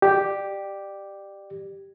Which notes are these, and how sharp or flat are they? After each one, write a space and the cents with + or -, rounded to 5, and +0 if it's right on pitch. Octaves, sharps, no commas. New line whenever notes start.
G4 +0 D5 +25